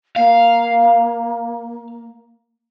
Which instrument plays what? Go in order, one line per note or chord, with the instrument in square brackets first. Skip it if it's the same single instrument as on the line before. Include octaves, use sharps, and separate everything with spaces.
[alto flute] A#3 [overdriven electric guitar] F5